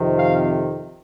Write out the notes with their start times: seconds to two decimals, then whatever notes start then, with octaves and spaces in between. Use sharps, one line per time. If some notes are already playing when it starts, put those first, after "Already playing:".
Already playing: F2 C3 D#3
0.19 F5